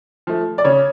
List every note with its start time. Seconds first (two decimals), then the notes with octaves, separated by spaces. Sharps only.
0.27 F3 A3
0.58 D5
0.64 C#3 C#5